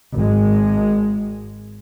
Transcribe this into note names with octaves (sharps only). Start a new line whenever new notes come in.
G#1 G#3